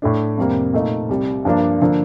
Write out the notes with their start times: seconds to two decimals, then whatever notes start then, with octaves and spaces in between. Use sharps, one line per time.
0.02 A2 A3 D4
0.37 F2 C3 G3 A#3
0.73 A#2 A3 D#4
1.09 C2 C3 G3
1.45 G2 F3 A#3 D4
1.82 D3 F3 A#3